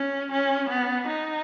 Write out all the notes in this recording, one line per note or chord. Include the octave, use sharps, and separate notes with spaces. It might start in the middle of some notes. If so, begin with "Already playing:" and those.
Already playing: C#4
C#4
B3
D#4